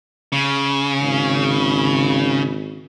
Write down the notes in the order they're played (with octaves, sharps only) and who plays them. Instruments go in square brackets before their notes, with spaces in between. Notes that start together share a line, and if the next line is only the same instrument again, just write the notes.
[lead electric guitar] C#3
[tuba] G#1